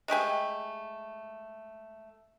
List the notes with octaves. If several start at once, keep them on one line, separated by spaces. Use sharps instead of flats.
G#3 A3 G4 G#5